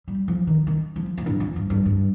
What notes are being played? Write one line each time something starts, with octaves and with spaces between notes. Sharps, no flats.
G3
F3
D#3
D#3
F3
F2
G2
F2
G2
G2
G2